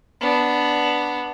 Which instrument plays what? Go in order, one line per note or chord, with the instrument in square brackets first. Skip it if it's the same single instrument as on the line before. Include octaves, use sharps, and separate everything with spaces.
[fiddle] B3 D4